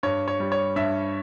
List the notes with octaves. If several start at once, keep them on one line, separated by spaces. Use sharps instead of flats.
G2 C#5
C#5
G3
C#5
G2 E5